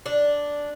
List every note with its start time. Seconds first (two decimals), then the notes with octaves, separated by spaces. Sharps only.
0.06 D4